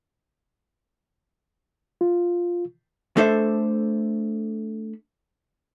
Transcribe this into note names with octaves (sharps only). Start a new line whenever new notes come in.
F4
A3 D4 A4 C5 E5